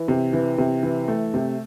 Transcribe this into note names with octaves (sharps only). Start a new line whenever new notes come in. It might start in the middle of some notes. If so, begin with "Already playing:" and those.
Already playing: E3
C3
E3
C3
E3
A3
C3